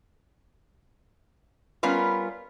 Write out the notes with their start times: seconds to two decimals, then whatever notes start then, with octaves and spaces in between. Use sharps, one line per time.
1.83 G3 B3 C#4 F4 A#4 B4